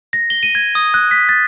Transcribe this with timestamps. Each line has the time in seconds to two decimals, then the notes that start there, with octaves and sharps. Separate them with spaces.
0.13 A#6
0.30 G7
0.43 D#7
0.55 G#6
0.75 D#6
0.94 F#6
1.11 B6
1.29 A6